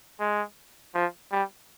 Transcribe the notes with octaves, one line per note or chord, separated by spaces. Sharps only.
G#3
F3
G3